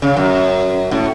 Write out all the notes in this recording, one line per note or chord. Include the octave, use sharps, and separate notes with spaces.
C#3
F#2
A2